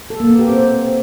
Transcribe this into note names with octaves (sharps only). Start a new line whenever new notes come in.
A4
A#3
B3
G4
C4